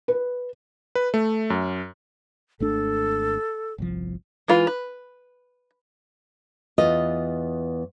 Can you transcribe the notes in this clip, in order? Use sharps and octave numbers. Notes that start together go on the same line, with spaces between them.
B4
B4
A3
F#2
G#1 A3 D4 A4
G1 C2 F3
E3 G#3 F4 B4
B4
E2 F4 B4 D#5